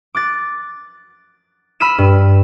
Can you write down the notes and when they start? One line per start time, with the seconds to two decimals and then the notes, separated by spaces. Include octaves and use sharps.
0.15 D6 F#6 A6
1.80 B5 E6 F6 B6 D#7 E7
1.98 G2